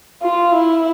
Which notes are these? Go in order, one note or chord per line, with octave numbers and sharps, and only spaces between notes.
F4
E4